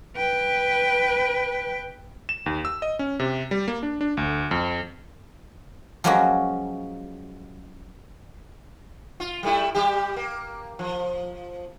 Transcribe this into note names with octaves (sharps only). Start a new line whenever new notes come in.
B4 G5
E7
D#2
E6
D#5
C#4
C3
G3
A#3
D4
D4
D2
F2
F3 F#3 G#3 A#3 C#4 F#4
F4
G3 A3 E4
G3 G4
A#3
F3